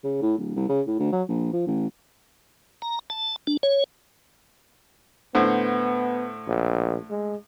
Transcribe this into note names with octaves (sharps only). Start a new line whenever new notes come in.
C#3
A2
D1
C2
C#3
A2
D2
F#3
A#1
F3
A1
A#5
A5
D4
C#5
A2 D3 B3 C5
A#1
G#3